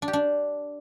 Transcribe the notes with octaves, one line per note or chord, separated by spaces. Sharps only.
D4
G4
D4